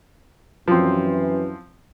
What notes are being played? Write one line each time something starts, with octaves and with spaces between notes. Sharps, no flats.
F#2 E3 F3 C4